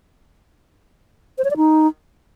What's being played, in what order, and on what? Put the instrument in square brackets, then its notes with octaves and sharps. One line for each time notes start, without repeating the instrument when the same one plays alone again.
[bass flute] C5
C#5
D5
D#4